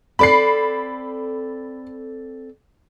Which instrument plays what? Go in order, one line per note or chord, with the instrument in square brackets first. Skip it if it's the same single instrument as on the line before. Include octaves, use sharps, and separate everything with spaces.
[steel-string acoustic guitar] C4 A4 D5 [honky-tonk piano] B5 C7